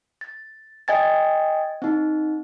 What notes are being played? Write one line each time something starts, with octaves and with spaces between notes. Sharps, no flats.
A6
D#5 G5 G#5 G#6 A6
C4 D#4